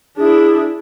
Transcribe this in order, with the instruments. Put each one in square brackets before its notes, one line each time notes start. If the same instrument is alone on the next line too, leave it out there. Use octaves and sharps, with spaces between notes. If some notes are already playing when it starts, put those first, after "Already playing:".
[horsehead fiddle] D4 E4 [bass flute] G#4